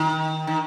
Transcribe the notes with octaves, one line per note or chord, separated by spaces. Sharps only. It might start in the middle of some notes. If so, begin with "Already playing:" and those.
Already playing: D#3
D#3